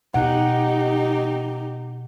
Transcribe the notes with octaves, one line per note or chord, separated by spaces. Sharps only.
B2 D#4 G4 F#5